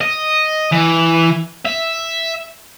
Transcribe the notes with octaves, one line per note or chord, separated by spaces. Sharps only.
D#5
E3
E5